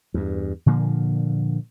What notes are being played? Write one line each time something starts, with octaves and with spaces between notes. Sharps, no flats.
E2 G2
A#2 D3 F3 A#3